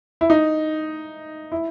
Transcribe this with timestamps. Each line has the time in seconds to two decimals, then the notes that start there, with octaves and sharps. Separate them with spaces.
0.21 E4
0.30 D#4
1.52 E4